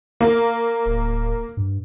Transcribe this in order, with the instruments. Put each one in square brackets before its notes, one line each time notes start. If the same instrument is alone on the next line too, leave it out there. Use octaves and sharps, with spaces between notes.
[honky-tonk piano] A#3
[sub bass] D1
G2